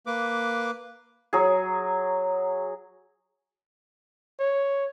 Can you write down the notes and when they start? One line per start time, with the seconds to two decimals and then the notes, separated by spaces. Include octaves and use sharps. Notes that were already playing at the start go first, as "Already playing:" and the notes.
0.06 A#3 B4 D6
1.33 F#3 G#4
4.40 C#5